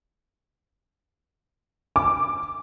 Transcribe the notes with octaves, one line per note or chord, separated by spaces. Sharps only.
D6